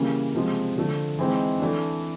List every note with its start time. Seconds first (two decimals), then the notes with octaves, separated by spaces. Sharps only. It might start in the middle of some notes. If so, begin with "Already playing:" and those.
Already playing: C#3 E3 G3 A#3 C#4
0.35 C3 F3 G#3
0.76 D3 F3 A3
1.19 E3 G#3 C4 D#4
1.60 E3 A3 D4